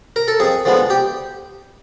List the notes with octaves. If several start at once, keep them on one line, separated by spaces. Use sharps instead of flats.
A#4
A4
F2 G#4
D3 F3 G#3 B3
G4